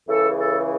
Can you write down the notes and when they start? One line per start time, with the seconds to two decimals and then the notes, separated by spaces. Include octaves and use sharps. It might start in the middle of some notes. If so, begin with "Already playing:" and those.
0.08 C#2 C#3 E3 A4
0.38 A4